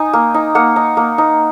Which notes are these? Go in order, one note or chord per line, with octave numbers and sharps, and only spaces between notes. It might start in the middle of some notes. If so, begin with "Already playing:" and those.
Already playing: D#4 G#5
A#3
D#4
A#3 F#5
D#4
A#3
D#4